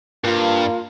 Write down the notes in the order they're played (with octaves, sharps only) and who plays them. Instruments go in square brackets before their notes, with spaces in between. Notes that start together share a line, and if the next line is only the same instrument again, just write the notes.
[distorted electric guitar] G2 [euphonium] A#3 [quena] F4